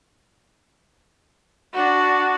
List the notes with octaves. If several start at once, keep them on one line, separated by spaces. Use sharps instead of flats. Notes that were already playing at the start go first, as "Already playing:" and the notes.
D4 F#4